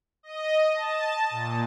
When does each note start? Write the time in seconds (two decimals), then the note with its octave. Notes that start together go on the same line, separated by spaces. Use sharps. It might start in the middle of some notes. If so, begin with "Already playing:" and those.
0.23 D#5
0.74 A5
1.30 A#2